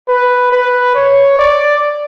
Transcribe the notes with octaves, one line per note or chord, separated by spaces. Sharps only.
B4
B4
C#5
D5